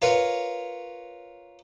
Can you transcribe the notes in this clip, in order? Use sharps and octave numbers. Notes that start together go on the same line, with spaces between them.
F4 A#4 B4 C#5